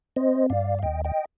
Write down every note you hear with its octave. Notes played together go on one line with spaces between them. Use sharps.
C4 C5 D#5
G2 D5 F5
F5
D#2 D#5 G5
D#5 G5